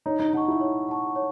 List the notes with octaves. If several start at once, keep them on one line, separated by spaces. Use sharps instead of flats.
D#4 C#5
D#4
D#4 F#5 A5 C#6
E4
C#5
F#5 A5 C#6
C#5